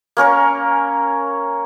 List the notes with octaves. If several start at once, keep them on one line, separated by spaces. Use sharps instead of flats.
A#3 C#4 A#4 C#5